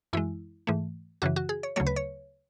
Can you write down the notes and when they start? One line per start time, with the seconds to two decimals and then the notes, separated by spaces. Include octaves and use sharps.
0.13 F#2 E3 G#3 E4
0.67 G#2 E3 A3
1.22 F#2 C#3 E3 F#4
1.36 F#4
1.49 G#4
1.63 C#5
1.76 D2 C#3 F#3 A3 C#5
1.87 B4
1.96 C#5